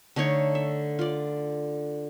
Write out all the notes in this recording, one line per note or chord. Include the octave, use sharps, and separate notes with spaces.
D3 A3 D#4 C#5
E5
F4 D5